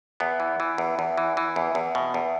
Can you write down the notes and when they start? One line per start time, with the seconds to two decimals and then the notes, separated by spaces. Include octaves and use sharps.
0.20 E2 B3
0.40 E3
0.60 E3
0.78 E2
0.99 E2
1.18 E3
1.37 E3
1.56 E2
1.75 E2
1.95 B2
2.14 E2